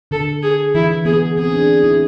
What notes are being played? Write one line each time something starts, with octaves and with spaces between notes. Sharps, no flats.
D3 A4
G#4
E3 E4
B3 G#4
C4 G#4
D4
E4